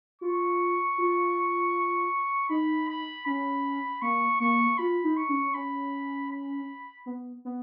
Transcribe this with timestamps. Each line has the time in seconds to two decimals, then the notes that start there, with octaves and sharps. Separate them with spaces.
0.21 F4 C#6
0.98 F4
2.49 D#4 B5
2.88 B5
3.26 C#4 B5
4.02 A#3 C#6
4.40 A#3 C#6
4.78 F4 B5
5.04 D#4
5.17 C#6
5.29 C#4
5.54 C#4 B5
6.30 B5
7.06 B3
7.45 B3